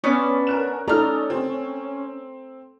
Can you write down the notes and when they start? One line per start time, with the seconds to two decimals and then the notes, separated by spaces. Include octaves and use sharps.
0.04 B3 C#4 D4 D6
0.47 A#4 F#6 E7
0.88 D#4 A4 D5 A#5 F6
1.30 C4